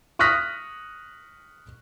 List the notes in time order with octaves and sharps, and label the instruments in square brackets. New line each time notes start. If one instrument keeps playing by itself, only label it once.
[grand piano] C#6 D#6 F6 F#6 A#6 B6